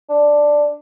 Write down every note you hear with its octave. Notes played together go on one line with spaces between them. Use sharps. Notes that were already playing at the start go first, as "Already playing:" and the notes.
D4